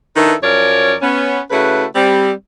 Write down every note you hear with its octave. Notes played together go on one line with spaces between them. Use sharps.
D#3 D4 E4 A4 B4
F#2 F3 C#4 A#4 C#5 D5
B3 C#4
C#3 A3 E4 F#4 B4
G3 C4